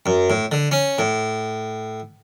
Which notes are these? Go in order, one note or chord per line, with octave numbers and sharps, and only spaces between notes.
F#2
A2
D3
C#4
A2